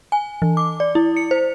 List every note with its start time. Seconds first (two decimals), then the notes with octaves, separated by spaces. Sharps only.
0.12 G#5
0.42 E3
0.57 D6
0.80 D5
0.95 E4
1.17 C#7
1.31 C5